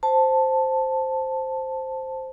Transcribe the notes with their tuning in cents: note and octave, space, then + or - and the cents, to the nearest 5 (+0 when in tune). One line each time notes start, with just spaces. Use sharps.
C5 +0 A5 +0